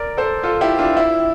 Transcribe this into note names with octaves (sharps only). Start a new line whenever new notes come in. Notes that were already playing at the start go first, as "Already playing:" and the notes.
Already playing: A#4 D5
A4 C5
F4 A4
E4 G4
D4 F4
E4